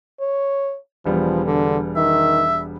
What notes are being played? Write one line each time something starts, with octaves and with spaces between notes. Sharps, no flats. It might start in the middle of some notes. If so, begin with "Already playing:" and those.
C#5
E1 F3 G3 B3
D3
D#3 E5